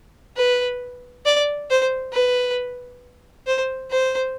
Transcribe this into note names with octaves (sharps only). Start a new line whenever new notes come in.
B4
D5
C5
B4
C5
C5